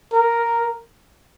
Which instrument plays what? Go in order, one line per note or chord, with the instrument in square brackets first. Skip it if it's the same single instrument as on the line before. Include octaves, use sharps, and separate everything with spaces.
[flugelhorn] A#4